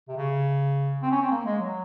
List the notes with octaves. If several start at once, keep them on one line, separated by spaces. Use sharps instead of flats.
C3
C#3
C4
C#4
C4
A#3
G#3
F#3